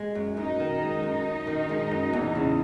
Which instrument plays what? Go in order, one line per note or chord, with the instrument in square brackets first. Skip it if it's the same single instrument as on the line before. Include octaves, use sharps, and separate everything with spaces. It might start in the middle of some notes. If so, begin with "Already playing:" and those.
Already playing: [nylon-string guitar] G#3
F#2
[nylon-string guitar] F#2 [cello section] D#4
[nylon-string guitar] D#3
G#3
F#2
F#2
D#3
G#3
F#2
E2
C#3